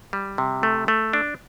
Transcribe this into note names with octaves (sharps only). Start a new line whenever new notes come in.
G3
C3
A3
A3
D4